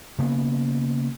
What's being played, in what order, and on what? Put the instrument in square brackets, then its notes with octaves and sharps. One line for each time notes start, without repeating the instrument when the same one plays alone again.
[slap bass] C#3 A#3 B3